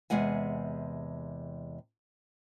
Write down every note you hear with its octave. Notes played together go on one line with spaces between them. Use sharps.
E2 C3 G#3 F#5 G#5